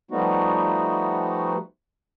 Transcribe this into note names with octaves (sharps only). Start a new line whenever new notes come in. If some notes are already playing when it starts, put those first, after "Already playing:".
F3 G3 A3 B3 D#4 F#4